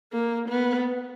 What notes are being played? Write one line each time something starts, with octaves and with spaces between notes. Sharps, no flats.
A#3
B3